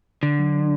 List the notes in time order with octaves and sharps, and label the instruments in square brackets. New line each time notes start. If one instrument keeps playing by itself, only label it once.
[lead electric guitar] D3 [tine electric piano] D4
[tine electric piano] F#3
F#3